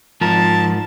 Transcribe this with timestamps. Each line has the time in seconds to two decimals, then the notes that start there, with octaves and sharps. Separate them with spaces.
0.21 G#2 F3 A#4 A5